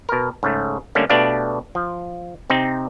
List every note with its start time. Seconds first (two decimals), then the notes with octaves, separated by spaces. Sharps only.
0.09 B2 A#4
0.43 G#2 C#3 A3
0.95 D3 G3 A3 A#3 C#4
1.09 B2 A3 D4 G4 D5 F5
1.75 F3
2.50 C3 C4 D#4